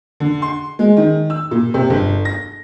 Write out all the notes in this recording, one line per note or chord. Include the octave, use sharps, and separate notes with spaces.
D3
C6
G#3
D#3
E6
A#2
C3
G1
A#6